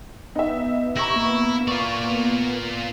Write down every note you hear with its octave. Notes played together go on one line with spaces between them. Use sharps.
B3 D#4 E5
E4 G4 A#5 C#6 A#6
A#3
F4 D5 C#6